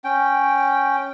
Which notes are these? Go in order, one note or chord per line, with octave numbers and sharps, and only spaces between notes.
C#4 G5